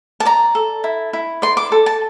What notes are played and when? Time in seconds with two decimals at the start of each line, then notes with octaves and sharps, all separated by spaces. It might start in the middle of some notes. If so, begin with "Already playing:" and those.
0.20 A5
0.25 D5 A#5
0.55 A4
0.84 E4
1.13 E4
1.42 D5 C6
1.57 D6
1.72 A4
1.86 A5